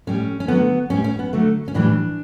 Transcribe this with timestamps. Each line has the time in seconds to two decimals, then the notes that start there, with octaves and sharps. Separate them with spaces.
0.07 A2 G3 C#4
0.40 C#4
0.48 D3 F#3 A3 B3
0.90 A2 G3 C#4
1.04 C#4
1.19 B3
1.33 D3 F#3 A3
1.68 C#4
1.74 A2 E3 G3 D4